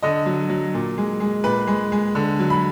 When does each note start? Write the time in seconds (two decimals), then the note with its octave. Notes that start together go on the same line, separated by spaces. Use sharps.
0.02 D3 D#5
0.26 F#3
0.49 F#3
0.74 A#2
0.98 G#3
1.20 G#3
1.44 A#2 B4
1.67 G#3
1.92 G#3
2.15 D3
2.39 F#3
2.50 B5